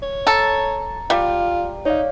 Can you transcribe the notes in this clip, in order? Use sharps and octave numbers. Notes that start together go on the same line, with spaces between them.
C#5
A4 A#5
G3 F4
D#4 C#5 D5 F5